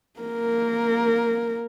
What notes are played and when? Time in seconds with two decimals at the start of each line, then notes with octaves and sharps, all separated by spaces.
0.20 A#3 A#4